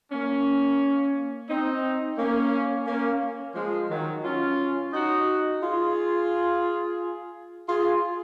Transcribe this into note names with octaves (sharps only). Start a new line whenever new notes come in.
A#3 C#4
C4 D#4
A#3 C#4
A#3 C#4
F3 G#3
D#3 F#3
C#4 F4
D#4 F#4
F4 G#4
F4 G#4